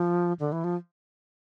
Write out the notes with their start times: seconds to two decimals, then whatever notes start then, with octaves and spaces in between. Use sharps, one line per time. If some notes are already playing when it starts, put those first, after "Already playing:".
Already playing: F3
0.40 D3
0.52 E3
0.64 F3